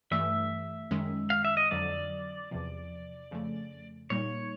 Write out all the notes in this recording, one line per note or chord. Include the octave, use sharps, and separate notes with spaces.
G2 E3 A3 E5
F#2 D#3 G#3 C#4
F5
E5
D#5
F2 D3 F#3 D5
E2 C3 F3
F2 C#3 F3 A3
A#2 G3 A#3 D#4 C#5